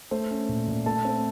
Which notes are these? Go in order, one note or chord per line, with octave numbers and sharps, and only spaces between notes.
A3 C5
C#4
A#2
A#2
A3 A5
C4